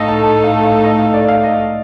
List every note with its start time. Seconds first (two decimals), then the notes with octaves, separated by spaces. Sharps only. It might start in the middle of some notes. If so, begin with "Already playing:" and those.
Already playing: A2 A3 D#4 A4 D#5 F5
0.08 A5
0.23 A5
0.44 F5
0.64 F5
0.84 D#5
0.99 F5
1.14 D5
1.28 F5
1.44 D#5